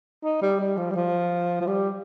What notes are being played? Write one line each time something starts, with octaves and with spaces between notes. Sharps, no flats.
D#4
G3
G3
F3
G3
F3
F3
G3